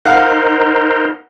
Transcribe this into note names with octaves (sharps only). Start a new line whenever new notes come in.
D#4 A#4 C5 F5 F#5